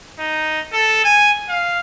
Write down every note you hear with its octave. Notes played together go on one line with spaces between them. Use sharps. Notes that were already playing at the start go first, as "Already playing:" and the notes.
D#4
A4
G#5
F5